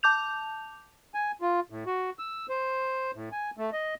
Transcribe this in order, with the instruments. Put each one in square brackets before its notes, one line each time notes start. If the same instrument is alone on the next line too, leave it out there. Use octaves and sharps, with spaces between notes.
[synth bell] A5 D6 G6 F7
[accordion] G#5
F4
A2
F#4
E6
C5
A2
G#5
A3
D#5